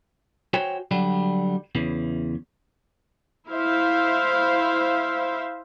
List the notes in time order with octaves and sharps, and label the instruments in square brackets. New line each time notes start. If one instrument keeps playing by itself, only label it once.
[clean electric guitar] F#4 C5 C#5 G5 G#5
D3 F#3 G3
E2 C#3 E3
[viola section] E4 C5 E5 F5